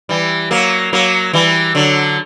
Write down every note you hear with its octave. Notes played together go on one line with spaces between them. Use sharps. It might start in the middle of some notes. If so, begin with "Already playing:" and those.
E3 G3
F#3 A#3
F#3 A#3
E3 G3
D3 F#3